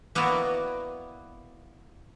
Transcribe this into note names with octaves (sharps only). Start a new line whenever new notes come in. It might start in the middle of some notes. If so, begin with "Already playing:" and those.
A#3 B3 E4 F#4 D5